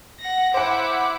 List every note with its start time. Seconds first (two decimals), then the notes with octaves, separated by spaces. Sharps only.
0.20 F#5 A#6
0.54 E4 C5 F#5 D6